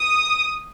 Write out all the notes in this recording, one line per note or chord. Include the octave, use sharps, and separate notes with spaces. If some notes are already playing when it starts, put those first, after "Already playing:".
Already playing: D#6